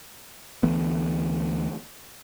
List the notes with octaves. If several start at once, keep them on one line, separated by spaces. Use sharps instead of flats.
D2 E3 A3 B3